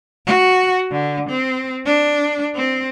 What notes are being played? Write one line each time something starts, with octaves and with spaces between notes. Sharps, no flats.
F#4
D3
C4
D4
C4